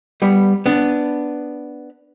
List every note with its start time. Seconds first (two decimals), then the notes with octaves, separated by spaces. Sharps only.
0.22 G3 B3
0.66 B3 D4